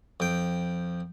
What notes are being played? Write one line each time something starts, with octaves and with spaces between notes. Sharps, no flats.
F2 G5